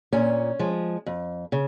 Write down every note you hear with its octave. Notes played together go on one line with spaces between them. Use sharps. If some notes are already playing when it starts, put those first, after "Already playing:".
A#2 C#4
F3 G#3
F2
C#3